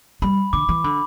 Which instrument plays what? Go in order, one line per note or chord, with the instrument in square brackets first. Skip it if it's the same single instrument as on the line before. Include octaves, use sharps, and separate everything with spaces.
[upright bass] G3 [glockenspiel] B5
[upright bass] D3 [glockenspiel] D6
[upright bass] E3
[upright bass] D3 [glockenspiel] B5